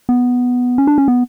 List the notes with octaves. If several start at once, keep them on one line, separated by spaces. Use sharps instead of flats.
B3
C#4
D4
C#4
B3